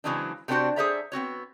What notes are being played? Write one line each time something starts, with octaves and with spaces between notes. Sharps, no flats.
C#3 E3 F#3 G#3 C4 D4
C3 A3 C4 D4 F#4 C5
G#4 A4 C5 D5 E5 A#5
B3 C4 F#4 C#5